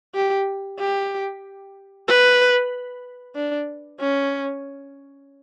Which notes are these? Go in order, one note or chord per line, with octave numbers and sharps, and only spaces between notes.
G4
G4
B4
D4
C#4